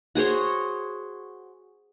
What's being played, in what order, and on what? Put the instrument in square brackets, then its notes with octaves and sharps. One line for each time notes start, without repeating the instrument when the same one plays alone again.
[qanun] F#4 G#4 C5 C#5